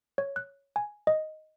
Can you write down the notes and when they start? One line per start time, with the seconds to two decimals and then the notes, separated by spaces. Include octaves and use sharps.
0.18 C#5
0.36 F#6
0.76 G#5
1.07 D#5